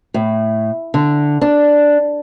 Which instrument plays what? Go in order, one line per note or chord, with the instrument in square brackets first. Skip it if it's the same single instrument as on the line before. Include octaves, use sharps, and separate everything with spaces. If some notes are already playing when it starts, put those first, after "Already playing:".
[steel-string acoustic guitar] A2
D3
D4